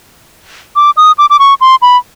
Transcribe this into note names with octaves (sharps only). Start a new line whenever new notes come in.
D6
D#6
D6
D6
C#6
C6
B5